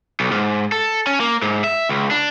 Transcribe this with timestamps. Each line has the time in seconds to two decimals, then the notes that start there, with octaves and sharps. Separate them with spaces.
0.20 B1
0.32 G#2
0.72 A4
1.07 C#4
1.20 A#3
1.42 G#2
1.64 E5
1.89 C#2
2.11 D4